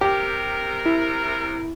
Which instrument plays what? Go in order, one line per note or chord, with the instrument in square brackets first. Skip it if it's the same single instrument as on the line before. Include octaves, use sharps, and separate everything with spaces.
[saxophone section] C3 A#4 [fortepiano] G4
[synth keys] E4